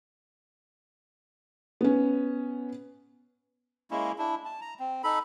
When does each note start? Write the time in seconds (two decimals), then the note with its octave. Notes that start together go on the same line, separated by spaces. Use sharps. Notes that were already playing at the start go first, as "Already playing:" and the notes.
1.81 B3 C#4
3.91 G#3 A#3 C#4 E4
4.18 D4 E4
4.45 A5
4.61 A#5
4.79 C4
5.04 D#4 A4 B5